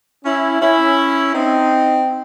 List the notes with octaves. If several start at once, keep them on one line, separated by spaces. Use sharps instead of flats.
C#4 E4
C#4 E4
C4 D#4